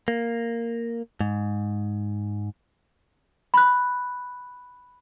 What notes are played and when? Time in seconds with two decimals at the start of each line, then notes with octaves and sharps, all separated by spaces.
0.08 A#3
1.21 G#2
3.54 B5 F#6